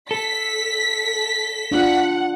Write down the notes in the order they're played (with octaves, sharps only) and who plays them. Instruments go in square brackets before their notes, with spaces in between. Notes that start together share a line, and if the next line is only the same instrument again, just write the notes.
[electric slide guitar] A4 [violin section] B6
[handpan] D4 F4 [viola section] F#5